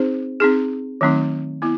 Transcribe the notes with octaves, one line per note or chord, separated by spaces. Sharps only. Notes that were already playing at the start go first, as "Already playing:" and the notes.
Already playing: C4 D#4 G#4 C5
C4 D#4 G#4
D#3 F#3 A3 C4 D#4
B3 E4